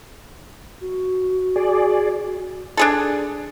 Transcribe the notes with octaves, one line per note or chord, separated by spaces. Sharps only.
F#4
G#4 D5
D4 G#4 A4